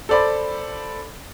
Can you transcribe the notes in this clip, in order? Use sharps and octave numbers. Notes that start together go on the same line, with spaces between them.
A4 C5 D5 B5